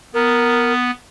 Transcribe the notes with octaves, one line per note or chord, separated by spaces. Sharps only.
B3 A#4